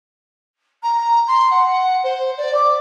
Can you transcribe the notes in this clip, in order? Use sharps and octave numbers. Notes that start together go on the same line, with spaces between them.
A#5
C6
F#5
C5
D5
D6